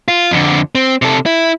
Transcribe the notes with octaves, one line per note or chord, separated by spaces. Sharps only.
F4
F2 D3
C4
C3 A4
E4